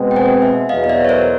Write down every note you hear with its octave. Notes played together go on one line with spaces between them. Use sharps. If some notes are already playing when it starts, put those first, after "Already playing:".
Already playing: B2 G#3 C4
G5
F#5 G#5
E5 F#5
E2 B2 F#3 D#5 F5
D#5
D5 E5
C#5
A#4 C5